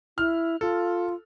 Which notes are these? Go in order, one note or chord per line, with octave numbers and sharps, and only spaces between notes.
E4 F6
F4 A4